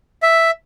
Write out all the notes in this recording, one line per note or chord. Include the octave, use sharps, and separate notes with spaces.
E5